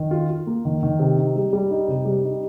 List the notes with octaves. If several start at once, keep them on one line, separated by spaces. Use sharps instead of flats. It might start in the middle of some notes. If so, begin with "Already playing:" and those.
Already playing: D#3
F4
F4
A#3
D#3
D#3
C3
D#4
G3
G3
D#4
C3
G3
D#4